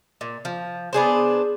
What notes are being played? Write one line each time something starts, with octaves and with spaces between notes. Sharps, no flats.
A#2
F3
B3 D4 G#4 C5